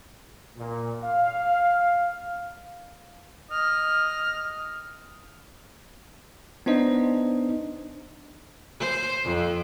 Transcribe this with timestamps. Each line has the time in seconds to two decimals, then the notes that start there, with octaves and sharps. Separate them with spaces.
0.57 A#2
1.03 F5
3.50 D#5 F6
6.66 B3 D4 D#4 C5 D#5
8.80 C5
9.24 F2